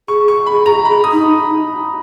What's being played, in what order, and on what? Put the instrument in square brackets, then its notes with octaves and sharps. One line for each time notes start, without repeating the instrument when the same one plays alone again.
[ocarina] G#4 [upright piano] C#6
[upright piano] C#6
B5
A#5
B5
D#6
[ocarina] D#4